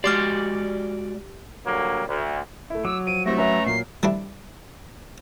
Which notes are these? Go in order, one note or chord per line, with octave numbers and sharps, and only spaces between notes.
G#3 F#4 G4 D5 D6 F6
D3 F#3 G3 A#3
D2
A3 E4
F#3 D6 E6
F3 D7 D#7
G3 A3 C4 E4 A#6
C#4 B4 E5 A#5
A#2 F#3 A#3 C7
G3 C4 D4 E4